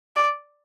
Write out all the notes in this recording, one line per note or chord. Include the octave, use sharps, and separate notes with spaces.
D5